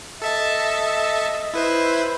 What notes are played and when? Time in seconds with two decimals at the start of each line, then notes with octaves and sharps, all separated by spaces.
0.22 A4 D#5 E5 A5
1.54 E4 B4 C5